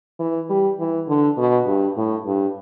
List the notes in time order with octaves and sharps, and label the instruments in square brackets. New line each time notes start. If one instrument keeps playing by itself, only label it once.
[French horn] E3
G3
E3
D3
B2
G2
A2
G2